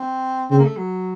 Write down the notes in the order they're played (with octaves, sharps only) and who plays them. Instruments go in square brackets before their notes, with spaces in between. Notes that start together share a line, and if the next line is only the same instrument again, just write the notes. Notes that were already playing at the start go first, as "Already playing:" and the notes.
Already playing: [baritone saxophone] C4
[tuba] C#3 [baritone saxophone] C4
[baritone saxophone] A#3
A3
F#3